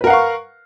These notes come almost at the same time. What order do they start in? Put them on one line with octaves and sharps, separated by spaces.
B4 A#4 F#5 F5 C#6